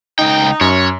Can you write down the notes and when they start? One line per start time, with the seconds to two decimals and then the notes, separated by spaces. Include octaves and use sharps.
0.19 C#2 D#4 G5
0.61 F#2 C#5